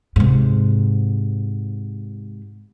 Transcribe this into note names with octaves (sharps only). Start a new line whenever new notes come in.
G#2 C3